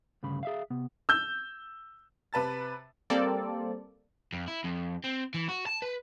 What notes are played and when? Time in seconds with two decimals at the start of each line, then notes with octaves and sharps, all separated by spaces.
0.23 D2 G2 C#3 B5
0.43 G#4 E5 F5
0.70 C3 B3
1.09 E6 G6
2.33 C3 B4 A5 A6
3.10 G3 A#3 C4 A4 D5
4.33 F2
4.48 E4
4.65 F2
5.04 C4
5.34 E3
5.49 F#4
5.67 A5
5.82 B4